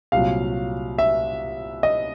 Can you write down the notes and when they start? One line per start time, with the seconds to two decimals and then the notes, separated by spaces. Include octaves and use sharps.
0.12 C2 A#2 F#3 F5
0.98 E5
1.83 D#5